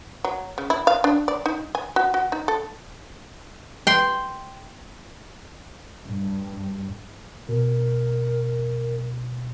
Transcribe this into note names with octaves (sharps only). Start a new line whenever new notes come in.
F#3
C#3
E4
F5
D4
D5
D#4
G#5
F#4
F#4
D#4
A4
G5 C6
G2
B2 A#4